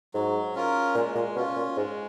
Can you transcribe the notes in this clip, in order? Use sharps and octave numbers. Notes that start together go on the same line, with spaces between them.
G#2 F#3
C#4 F4 A#4
A#2 G#3
A#2
B2 C#4 F4
A#2
G#2 G#3